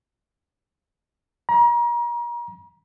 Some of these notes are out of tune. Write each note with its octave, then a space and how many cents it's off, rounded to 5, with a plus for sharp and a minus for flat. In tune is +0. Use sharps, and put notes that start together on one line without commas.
A#5 +35